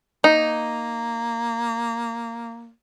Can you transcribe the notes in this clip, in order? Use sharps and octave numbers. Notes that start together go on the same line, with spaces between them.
A#3 D#4